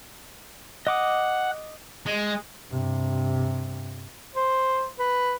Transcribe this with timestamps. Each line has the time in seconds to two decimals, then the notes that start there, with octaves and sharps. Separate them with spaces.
0.87 D#5 F#5 D6 D#6
2.06 G#3
2.70 G2 C3
4.35 C5
4.99 B4